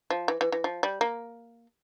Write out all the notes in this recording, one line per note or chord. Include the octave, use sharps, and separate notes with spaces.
F3
E3
E3
E3
F3
G3
A#3